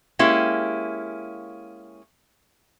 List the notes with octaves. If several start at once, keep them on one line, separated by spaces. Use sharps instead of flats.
G#3 A#3 C#4 E4 G4